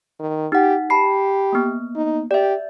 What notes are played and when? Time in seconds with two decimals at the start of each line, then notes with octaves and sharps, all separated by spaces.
0.19 D#3
0.52 D#4 G4 F#5
0.90 G4 A5 B5 C7
1.52 A#3 B3
1.95 D#4
2.31 G4 D5 E5